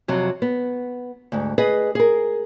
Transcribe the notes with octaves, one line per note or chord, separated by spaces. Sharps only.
F2 C3 F#3
B3
D2 G#2
G#4 B4 D#5
G#4 A#4